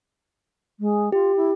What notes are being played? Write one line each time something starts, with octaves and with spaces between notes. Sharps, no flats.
G#3
F4 G4
E4